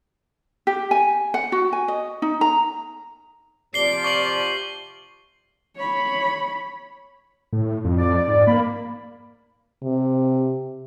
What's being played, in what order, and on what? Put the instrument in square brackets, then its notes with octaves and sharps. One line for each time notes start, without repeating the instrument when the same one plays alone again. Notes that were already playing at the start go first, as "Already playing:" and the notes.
[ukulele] G4
G#5
F#5
F#4
G#5
D#5
D#4
A#5
[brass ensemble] C3 F3 G4 [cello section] D5 [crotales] C7 G7
[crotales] C#6 F#7
[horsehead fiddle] C#5 B5
[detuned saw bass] A2
F2
[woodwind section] D5
[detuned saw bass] G#2
[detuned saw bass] A#3 [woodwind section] B5
[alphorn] C3